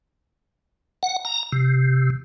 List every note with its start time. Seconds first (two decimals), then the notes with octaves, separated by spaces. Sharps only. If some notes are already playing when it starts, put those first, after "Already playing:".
1.03 F#5
1.25 A#5
1.52 C3